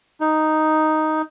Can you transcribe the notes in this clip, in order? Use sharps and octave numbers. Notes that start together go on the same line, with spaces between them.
D#4